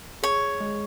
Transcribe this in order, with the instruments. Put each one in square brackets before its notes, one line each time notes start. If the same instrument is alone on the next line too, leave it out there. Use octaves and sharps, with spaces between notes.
[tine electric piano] G#4 [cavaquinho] C#5
[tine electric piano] G#3